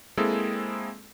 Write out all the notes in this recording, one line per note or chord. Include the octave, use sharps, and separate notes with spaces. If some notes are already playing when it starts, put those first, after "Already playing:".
G#3 A#3 C4 E4 G#4 A4